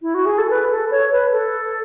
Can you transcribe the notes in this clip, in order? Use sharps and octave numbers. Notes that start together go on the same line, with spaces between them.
E4
F#4
G#4
A4
B4
A4
C#5
B4
A4